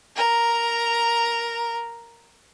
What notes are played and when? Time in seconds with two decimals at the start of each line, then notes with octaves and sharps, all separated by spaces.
0.16 A#4 A#5